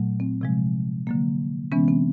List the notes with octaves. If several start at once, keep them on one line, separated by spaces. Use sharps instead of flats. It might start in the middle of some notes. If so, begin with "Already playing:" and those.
Already playing: A#2 F#3 A3
C4
C3 F3 G#3
D3 F#3 A#3
C3 E3 G#3 B3 C#4
C4